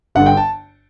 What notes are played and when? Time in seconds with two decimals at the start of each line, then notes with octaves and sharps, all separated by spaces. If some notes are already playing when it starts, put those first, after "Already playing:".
0.15 G1 G2 D3 F#5
0.26 G5
0.37 A5